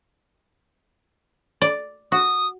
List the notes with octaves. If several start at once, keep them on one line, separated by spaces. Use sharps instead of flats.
D5
F#4 D#6